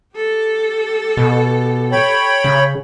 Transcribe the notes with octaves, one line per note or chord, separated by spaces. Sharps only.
G4 A4
B2
C#5 G5 B5
C#3